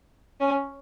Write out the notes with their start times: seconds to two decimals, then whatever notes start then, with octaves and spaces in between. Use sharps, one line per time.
0.40 C#4